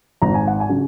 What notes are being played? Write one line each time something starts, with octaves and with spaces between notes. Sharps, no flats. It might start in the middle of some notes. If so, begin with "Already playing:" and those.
G#1 A#5
G#5
F#5
G#5
C#3 F#3